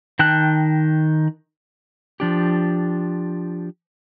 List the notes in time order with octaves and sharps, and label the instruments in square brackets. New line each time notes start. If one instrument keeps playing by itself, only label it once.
[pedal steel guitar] D#3 G5 A5 F#6
[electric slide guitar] F3 D4 G4